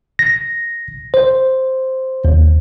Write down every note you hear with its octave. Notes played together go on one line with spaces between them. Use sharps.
A#6
C5
D#2